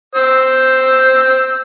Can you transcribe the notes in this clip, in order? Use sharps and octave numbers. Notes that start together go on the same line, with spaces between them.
C5 E6